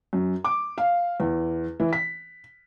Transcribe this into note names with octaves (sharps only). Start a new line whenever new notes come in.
F#2
D6
F5
E2
E3
B6